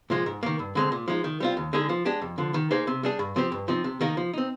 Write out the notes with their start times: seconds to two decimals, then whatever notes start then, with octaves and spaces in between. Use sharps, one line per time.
0.10 A#2 F3 G#3
0.26 G#2
0.43 D#3 A#3
0.59 G2
0.75 D3 G#3 C4
0.92 A#2
1.08 F3 G#3 D#4
1.24 D#3
1.40 G3 C4 F4
1.57 D#2
1.73 D3 G#3 D#4 G#4
1.89 F3
2.05 G#3 D4 G4
2.22 F2
2.38 D3 F3
2.54 D#3
2.71 A#3 D#4 G#4 C5
2.87 C3
3.03 G3 D4 G#4
3.19 G2
3.36 F3 C4 G4 C5
3.52 G2
3.68 F3 C4 D#4
3.84 C3
4.01 D#3 A#3 D#4 A#4
4.17 F3
4.33 C4 D#4